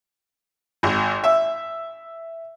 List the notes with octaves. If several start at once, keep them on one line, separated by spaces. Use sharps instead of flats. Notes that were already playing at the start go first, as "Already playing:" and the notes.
G#1
E5